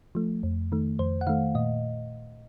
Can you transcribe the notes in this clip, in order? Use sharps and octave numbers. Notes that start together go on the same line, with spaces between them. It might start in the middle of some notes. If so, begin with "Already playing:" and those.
F3 A3
F2
D#3 A3
F2 C5
F#5
D#3 A3 F5
A#2 D#5